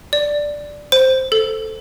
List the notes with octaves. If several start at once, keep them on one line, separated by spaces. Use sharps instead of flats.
D5
C5
A4